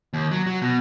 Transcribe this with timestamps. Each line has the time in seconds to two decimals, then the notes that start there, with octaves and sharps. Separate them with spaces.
0.13 D#2
0.31 F#3
0.46 F#3
0.62 B2